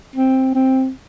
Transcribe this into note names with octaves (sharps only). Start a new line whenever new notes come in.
C4
C4